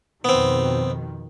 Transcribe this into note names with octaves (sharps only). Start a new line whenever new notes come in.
F2 B2 D#3 B3 C4